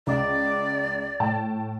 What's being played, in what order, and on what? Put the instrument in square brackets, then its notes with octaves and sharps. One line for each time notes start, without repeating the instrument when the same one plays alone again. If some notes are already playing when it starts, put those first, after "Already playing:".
[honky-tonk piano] C#2 D#5 D6 [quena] D5
[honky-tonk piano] A2 G5 A5